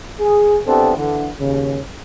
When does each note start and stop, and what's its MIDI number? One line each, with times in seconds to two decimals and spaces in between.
0.20 0.58 68
0.67 0.95 59
0.67 0.95 60
0.67 0.95 62
0.67 0.95 64
0.67 0.95 67
0.67 0.95 69
0.97 1.28 50
0.97 1.28 52
1.39 1.78 39
1.39 1.78 49